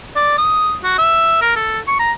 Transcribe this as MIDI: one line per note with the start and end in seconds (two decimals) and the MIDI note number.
0.16 0.35 74
0.38 0.76 87
0.84 0.98 66
0.98 1.42 76
1.42 1.55 70
1.56 1.80 69
1.88 1.96 85
2.00 2.12 82